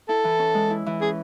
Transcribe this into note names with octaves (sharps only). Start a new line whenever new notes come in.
E4 A4
E3
C#4
G#3
E4
E3
C#4 G#4